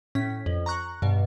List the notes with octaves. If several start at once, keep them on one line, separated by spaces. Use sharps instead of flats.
A2 C#4 B6
F2
A#5 C#6 F#6
G2 B2